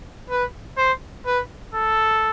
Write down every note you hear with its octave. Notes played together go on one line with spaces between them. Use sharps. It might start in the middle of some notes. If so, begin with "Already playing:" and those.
B4
C5
B4
A4